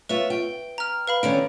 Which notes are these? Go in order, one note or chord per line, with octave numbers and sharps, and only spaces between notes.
F4 B4 C#5 E5
G5
A#5 F6
B4 F5 B5
D3 D#3 C#4 D7